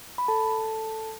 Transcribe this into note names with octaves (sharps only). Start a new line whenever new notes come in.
B5
A4 A5